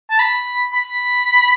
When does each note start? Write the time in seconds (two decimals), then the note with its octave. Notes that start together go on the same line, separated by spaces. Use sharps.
0.11 A5
0.19 B5
0.73 B5